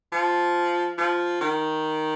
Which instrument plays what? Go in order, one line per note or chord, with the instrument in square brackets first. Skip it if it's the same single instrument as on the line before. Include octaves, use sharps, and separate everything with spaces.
[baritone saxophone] F3
F3
D#3